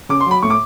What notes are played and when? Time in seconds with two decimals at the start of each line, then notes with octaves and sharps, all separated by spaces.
0.09 C#3 D6
0.20 C6
0.26 F#3 B5
0.42 A2 C#6
0.50 D6